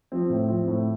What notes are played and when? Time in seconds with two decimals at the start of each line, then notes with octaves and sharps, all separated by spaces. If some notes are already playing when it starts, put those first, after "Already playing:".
0.12 F3 C4
0.30 A2
0.48 F3 C4
0.68 A2